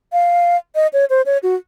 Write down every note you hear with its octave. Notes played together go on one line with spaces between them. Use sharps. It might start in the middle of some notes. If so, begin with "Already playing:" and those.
F5
D#5
C#5
C5
C#5
F#4